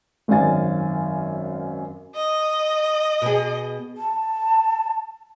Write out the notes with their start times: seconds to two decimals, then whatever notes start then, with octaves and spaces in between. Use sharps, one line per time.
0.28 G#1 F#2 D5 F5 G#5 A6
2.15 D#5
3.22 B2 G#4
3.97 A5